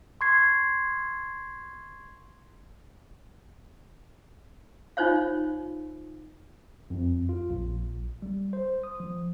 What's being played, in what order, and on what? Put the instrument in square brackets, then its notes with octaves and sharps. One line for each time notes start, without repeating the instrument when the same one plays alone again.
[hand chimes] C6 C#6 G#6 C7
[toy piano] D#4 F4 C5 C#5 F5
[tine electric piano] F2
F4
A#1
G3
C5
D#6
F3